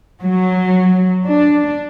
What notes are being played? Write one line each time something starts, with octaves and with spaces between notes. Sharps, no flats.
F#3
D4